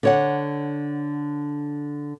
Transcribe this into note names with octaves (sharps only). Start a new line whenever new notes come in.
D3 C#5 F#5